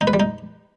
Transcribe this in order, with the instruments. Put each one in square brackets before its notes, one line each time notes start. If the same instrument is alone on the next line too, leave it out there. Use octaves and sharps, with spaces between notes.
[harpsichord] D#4
B4
G3
D#4